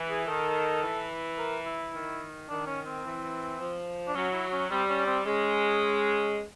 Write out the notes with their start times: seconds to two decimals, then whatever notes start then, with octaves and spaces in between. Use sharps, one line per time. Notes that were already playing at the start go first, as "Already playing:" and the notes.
Already playing: E3
0.10 G#4
0.28 D#3 A4
0.84 E3
1.38 A#4
1.66 E4
1.93 D#3
2.49 D#3 D4
2.67 C#4
2.86 C4
3.05 E3
3.59 F3
4.08 D4
4.15 F#3 C#4
4.33 E4
4.52 C#4
4.70 G3 C4
4.89 C#4
5.07 C4
5.26 G#3 C#4